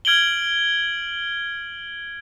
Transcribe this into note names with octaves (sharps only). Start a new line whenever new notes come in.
F6 G#6 D7 F#7 G7